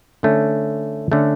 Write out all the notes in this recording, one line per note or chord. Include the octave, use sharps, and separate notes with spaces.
D3 A3 C#4
D3 A3 C#4